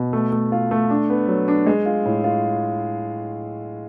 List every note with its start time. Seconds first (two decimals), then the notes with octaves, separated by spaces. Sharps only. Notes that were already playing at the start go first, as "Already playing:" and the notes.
Already playing: B2
0.13 A3
0.32 A3
0.52 F4
0.71 A3
0.90 D4
1.10 B3
1.28 F#3
1.48 D4
1.66 G#3
1.86 F4
2.06 A2
2.24 F4